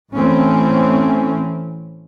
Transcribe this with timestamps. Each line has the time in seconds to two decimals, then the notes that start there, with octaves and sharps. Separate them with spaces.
0.14 A1 E3 A3 C4 C#4